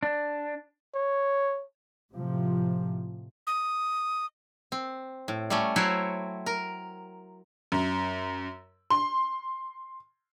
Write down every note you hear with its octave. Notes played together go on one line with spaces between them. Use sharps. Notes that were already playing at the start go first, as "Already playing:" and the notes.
D4
C#5
A2 C3 F3
D#6
C4
A2
G3 A3 C#4
F#3 E4 F#4 C5 C#5 G5
A#4
F#2
C6